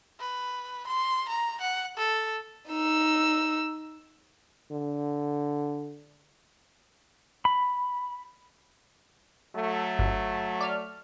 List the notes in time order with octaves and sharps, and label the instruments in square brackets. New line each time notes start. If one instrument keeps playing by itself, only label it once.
[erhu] B4
C6
A#5
F#5
A4
[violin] D#4 E6
[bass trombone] D3
[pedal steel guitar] B5
[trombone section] F#3 A3
[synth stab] G1
D5 F6